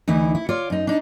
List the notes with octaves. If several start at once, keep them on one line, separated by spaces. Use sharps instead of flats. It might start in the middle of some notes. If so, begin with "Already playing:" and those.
D2 E3 D#4 E4
E4
F4 C#5 D5
F#2 D#4
D4 D#4